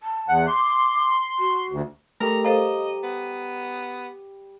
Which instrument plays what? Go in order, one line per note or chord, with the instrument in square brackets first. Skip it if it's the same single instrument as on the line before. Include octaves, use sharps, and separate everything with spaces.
[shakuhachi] A5
[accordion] E2 F#5
[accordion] C6 [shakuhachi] D6
[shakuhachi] F#4
[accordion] D2
[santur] G3 G4 C#6 [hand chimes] A3 A4 A#4 [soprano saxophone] A#5
[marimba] A4 C5 F5 [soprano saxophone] D#5 [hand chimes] A#5
[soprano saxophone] B3